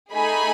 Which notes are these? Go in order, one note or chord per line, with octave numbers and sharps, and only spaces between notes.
A3 D#4 G#4 G#5 B5